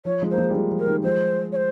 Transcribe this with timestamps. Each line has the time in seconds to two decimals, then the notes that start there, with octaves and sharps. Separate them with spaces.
0.05 F3 C#5
0.22 F3 G#3
0.30 A#3 C5
0.38 F3 G#3
0.50 G3
0.55 F3 G#3
0.71 F3
0.79 A#4
0.87 D#3 G3
1.03 F3 G#3 C5
1.52 C#5
1.56 C5